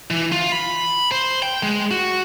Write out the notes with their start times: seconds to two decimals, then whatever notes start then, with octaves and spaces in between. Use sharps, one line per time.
0.11 E3
0.32 F4
0.52 B5
1.12 C5
1.42 G5
1.63 G#3
1.91 F#4